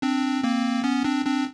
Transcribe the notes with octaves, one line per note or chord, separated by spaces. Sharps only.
C4 D4
A#3 C4
B3 C#4
C4 D4
C4 D4